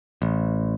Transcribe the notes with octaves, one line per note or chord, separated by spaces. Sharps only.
A1